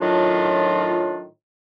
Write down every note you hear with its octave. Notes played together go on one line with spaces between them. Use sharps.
A2 D#3 F#3 D4 F4